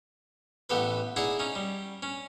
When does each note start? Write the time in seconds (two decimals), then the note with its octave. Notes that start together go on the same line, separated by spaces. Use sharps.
0.70 A1 B3 G4 A4 B4
1.16 D#4 E4 G#4 D5 F#5
1.39 C#4 D#4
1.55 G3
2.03 C#4